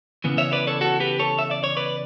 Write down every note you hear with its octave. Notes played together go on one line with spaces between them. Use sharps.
C#3 E3 B3
C#5 E5
B4 D5
A4 C#5
F#4 A4
G4 B4
A4 C#5
E5
D5
C#5
B4 D5